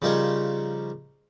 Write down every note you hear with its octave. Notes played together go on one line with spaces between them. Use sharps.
C#3 F3 G3 D#4 A#4 C#5